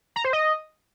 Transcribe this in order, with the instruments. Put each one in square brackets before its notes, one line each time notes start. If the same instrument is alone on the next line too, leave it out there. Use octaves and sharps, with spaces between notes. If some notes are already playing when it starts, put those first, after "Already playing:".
[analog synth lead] A#5
C5
D#5